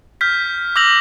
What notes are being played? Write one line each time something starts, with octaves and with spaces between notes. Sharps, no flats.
F6 G6 B6
D6 E6 G6 A#6 F7 F#7